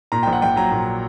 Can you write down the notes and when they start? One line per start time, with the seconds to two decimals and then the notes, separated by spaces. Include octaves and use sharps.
0.12 A#2 A#5
0.23 A#1 G5
0.33 F#5
0.42 A#1 G5
0.56 F#3 A#5
0.72 A#2